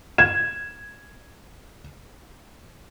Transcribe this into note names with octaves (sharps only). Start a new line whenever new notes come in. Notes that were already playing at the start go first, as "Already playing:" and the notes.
G#6 E7